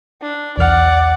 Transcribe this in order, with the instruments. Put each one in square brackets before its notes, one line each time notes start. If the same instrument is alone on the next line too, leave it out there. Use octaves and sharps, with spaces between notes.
[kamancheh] D4
[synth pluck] B1 E2 F6 [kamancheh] D5 F#5